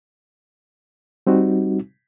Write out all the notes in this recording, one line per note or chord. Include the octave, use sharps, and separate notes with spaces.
G3 C4 D#4 F#4